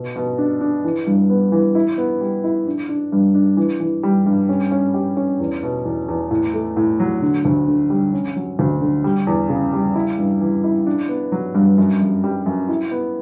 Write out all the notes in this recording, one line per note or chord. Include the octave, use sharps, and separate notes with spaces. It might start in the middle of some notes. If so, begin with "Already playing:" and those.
Already playing: B2
B2
D4
D4
E3
G2
B3
E3
E4
B3
G3
E4
D4
D4
G2
D4
E3
E3
G3
G2
C#4
C#4
G4
C#4
E2
B2
E2
E2
A2
A3
A2
F#3
D3
D2
D3
G3
C#4
F#3
D2
D3
G3
E2
C#3
G3
E4
G2
E3
E4
D4
B3
F#3
G2
F#2
F#2
G3
F#2
E4
B3